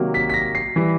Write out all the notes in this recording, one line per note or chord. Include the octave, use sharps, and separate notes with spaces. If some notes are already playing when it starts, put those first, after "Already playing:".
Already playing: C3 D#3 F#3 A#3
B6
B6
A#6
C7
E3 G3